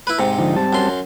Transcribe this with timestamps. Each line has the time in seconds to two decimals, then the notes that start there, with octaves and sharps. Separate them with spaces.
0.07 E4 B4
0.19 G#2 C3
0.38 D3 F3 D#4
0.56 G3 C4 A5
0.73 F#2 C6